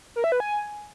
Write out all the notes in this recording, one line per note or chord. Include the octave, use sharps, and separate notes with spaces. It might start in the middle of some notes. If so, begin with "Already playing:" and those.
A#4
E5
B4
G#5